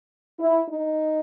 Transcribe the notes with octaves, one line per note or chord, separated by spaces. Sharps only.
E4
D#4